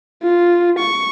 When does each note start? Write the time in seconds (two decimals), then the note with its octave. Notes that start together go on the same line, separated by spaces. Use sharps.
0.23 F4
0.78 C#6